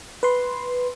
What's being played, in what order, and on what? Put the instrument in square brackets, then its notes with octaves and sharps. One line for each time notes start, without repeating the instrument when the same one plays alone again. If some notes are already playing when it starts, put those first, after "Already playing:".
[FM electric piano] B4 C6